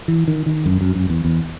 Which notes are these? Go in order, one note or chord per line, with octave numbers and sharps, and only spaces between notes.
E3
D#3
D#3
F#2
F#2
F#2
E2
E2